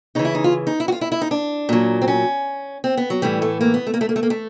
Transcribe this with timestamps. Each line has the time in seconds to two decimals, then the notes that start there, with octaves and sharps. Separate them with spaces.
0.15 C#3 E3 D#4
0.25 E4
0.35 D#4
0.44 F4
0.67 D#4
0.80 E4
0.88 F#4
0.92 F4
1.01 E4
1.12 E4
1.21 D#4
1.31 D4
1.69 A#2 F#3
2.02 C4
2.08 C#4
2.84 C4
2.97 B3
3.10 F#3
3.22 A2 E3 G3
3.42 A3
3.61 A#3
3.74 B3
3.87 A3
3.94 A#3
4.01 A3
4.09 A#3
4.16 A3
4.23 A#3
4.30 A3